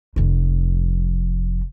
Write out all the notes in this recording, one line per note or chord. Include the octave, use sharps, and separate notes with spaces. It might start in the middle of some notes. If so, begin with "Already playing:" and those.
F1 F2